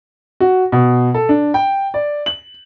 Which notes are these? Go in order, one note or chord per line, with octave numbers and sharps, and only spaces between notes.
F#4
B2
A4
D4
G5
D5
F#7